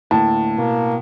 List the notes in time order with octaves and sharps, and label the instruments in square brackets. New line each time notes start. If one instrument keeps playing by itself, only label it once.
[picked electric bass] D2 A#3 [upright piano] A2 [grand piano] A5
[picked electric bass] B2 [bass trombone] A#3